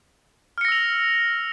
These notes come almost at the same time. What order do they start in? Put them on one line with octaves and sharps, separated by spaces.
F6 C#7 A#6 E6 F7